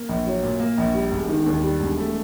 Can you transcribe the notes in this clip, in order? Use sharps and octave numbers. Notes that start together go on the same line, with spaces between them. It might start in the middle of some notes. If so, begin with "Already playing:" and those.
Already playing: A#3
A#1
F#3
A#2
A#3
A#1
G3
E1
D#3
D#2
G3
E1
A3